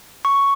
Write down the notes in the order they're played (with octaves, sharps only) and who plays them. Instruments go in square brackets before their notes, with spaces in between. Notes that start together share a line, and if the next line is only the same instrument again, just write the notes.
[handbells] C#6